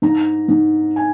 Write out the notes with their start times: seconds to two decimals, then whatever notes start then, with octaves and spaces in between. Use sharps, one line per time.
0.02 G#2 A#5
0.49 G#2
0.96 G#5